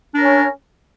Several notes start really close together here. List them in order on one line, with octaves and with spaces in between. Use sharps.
D4 A#4 C#5 C#4